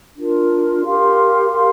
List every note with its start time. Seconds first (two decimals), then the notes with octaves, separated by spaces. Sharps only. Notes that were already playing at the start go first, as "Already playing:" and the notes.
0.16 D4 F4 A#4
0.83 G4 A#4 F5 C6
1.50 G4 A#4 F5 C6